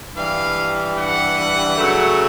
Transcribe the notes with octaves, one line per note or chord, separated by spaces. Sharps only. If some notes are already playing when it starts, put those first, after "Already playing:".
G2 E3 G3 F5
F#5
C#3 F#3 A3